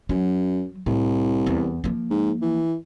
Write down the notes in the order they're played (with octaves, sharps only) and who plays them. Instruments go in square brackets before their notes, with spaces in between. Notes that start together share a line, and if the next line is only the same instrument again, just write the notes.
[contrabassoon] F#2 [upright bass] F#3
[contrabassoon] C2 [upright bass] A2
[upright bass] E2
F3 A#3
[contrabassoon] G#2
E3